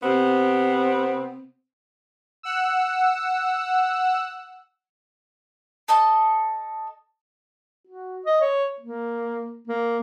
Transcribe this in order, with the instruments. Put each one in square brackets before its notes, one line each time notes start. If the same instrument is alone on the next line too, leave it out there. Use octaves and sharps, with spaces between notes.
[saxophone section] C3 B3 C4
[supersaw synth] F#5 E6
[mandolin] A4 D#5 A5
[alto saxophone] F#4
D#5
C#5
A#3
A#3